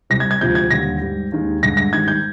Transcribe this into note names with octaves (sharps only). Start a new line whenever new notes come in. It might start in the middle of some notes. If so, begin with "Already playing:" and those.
C2 C3 G3 A#6
G#6
G#6
D2 C3 F3 G#3 G6
G#6
D#2 D3 G3 A#6
G#2 G3
D#2 D#3 G#3
G2 D3 G#3 A#6
A#6
G#2 D#3 G3 G#6
G6